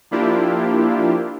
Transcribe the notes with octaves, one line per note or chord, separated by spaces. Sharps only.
F3 A#3 D4 E4 F4 G4